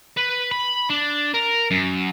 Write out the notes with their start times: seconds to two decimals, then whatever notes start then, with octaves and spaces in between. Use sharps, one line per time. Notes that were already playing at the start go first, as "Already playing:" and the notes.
0.17 B4
0.51 B5
0.90 D4
1.34 A#4
1.71 F#2